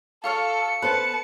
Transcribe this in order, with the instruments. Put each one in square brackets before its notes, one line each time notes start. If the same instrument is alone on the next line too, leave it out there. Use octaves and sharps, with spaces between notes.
[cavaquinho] F4 C#5 F5 [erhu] A4 [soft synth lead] C#7
[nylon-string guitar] B3 A4 C5 [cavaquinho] B4 [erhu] A5